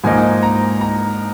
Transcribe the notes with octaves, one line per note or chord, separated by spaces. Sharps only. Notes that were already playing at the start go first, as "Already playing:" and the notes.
G#2 F3 A#3 D#4 G#5
A#5
A#5